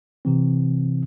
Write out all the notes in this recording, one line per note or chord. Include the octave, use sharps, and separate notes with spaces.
C3 E3 C4